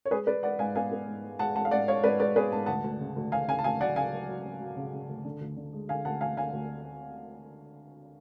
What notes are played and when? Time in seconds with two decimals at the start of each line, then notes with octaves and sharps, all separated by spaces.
0.05 C#5
0.11 G#3 G#4 B4
0.27 G#3 B4 D5
0.43 G#3 D5 F#5
0.59 G#2 F5 G#5
0.75 B3 F5 G#5
0.92 B3
1.08 G#2
1.24 G#3
1.39 G#3 F#5 A5
1.56 G#2 F#5 A5
1.65 F5
1.71 G#2 D5 F#5
1.87 G#3 C#5 F5
2.03 G#2 B4 D5
2.20 G#3 B4 D5
2.36 B3 G#4 B4
2.52 G#2 A5
2.66 D2 F#5 A5
2.84 D2
3.00 C#3
3.16 D2
3.32 D2 F5 G#5
3.48 C#3 F5 G#5
3.59 A5
3.64 D2 F5 G#5
3.80 F#3 D5 F#5
3.96 C#3 F5 G#5
4.13 F#3
4.29 F#3
4.45 F#3
4.61 F#3
4.77 C#3
4.93 C#3
5.09 D2
5.25 D3
5.41 D2
5.57 D3
5.73 G#3
5.89 D3 F5 G#5
6.05 D2 F#5 A5
6.21 D2 F5 G#5
6.37 D3 F5 G#5
6.53 D2